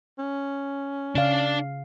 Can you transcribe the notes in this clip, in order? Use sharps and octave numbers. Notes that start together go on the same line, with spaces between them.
C#4
C#3 D4 D5 F5